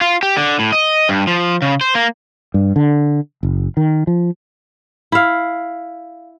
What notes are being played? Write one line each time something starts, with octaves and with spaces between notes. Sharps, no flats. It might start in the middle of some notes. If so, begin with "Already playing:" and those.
F4
G4
D3
A2
D#5
G2
F3
C#3
C5
A#3
G2
D3
F#1
D#3
F3
E4 F5